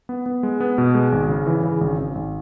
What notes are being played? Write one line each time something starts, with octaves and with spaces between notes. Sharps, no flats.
B3
B3
G#3
B3
B2
G#3
G#1
C#3
E3
C#3
G#1
G#1
G#1